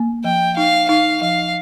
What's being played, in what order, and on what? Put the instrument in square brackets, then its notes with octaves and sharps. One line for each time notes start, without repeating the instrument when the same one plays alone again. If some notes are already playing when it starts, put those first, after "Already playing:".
Already playing: [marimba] A#3
[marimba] F3 [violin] G5
[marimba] D#4 [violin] F5
[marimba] D#4 [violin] F5
[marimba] F3 [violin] F5